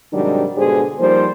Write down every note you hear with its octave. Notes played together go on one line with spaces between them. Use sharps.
G#2 C3 D#3 F#3 G3 D4
G#2 B2 D3 G4 G#4 C5
F3 G3 A#3 D#4 C5